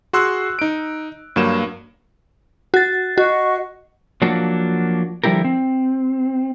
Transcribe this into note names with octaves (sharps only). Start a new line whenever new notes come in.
F#4 G#4 C6 E6 F#6
D#4 D7
G2 F#3 A#3 E7
F#4 A6
F#4 D#5 F#5 C#6
F3 F#3 A#3 D4 F#4
D3 F3 G3 E4 G4 A#4
C4